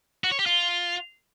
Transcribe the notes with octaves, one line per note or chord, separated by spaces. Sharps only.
F#4
C#5
G4
F4